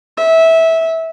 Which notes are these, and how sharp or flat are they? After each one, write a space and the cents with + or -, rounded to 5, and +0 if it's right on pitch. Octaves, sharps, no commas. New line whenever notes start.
E5 -15